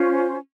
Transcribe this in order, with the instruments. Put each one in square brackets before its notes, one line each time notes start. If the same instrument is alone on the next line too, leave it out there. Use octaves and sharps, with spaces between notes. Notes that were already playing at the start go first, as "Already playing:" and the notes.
Already playing: [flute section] C#4 F4 C5